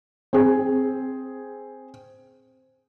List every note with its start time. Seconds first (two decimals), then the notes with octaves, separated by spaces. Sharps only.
0.33 C4 G#4